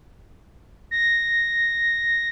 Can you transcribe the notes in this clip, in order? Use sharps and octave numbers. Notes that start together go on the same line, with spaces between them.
A#6